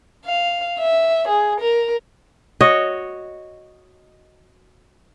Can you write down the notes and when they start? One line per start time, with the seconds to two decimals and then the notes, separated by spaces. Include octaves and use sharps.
0.25 F5
0.79 E5
1.28 G#4
1.60 A#4
2.61 F#4 C#5 D#5